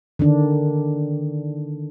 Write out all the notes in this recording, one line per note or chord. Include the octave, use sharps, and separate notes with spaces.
D3 D#3 D4